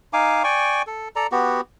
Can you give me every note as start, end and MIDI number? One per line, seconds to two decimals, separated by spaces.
0.13 0.43 63
0.13 0.43 77
0.13 0.43 80
0.13 0.43 86
0.44 0.82 74
0.44 0.82 79
0.44 0.82 80
0.44 0.82 85
0.87 1.08 69
1.16 1.27 69
1.16 1.27 74
1.16 1.27 82
1.32 1.61 59
1.32 1.61 66
1.32 1.61 67